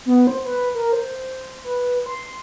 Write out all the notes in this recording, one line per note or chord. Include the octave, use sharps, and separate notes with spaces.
B3
C5
B4
A#4
C5
B4
C6